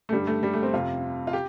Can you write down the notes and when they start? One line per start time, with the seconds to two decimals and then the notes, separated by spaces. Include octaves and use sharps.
0.09 A3
0.12 G2 D3 G3
0.27 A3
0.43 G3
0.53 A3
0.63 C4
0.73 F2 C3 F4
1.27 F4
1.33 G4